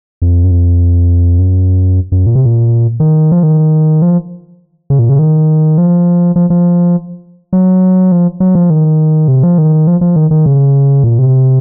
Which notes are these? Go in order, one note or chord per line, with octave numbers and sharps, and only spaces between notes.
F2
F#2
F2
F#2
F#2
A#2
C3
A#2
D#3
F3
D#3
F3
C#3
A#2
C#3
D#3
F3
F3
F3
F#3
F3
F#3
F3
D#3
C3
F3
D#3
F3
F3
D#3
D#3
C#3
A#2
C3